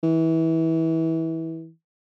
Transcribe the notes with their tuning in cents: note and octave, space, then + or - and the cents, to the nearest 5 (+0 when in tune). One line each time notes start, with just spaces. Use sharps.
E3 -25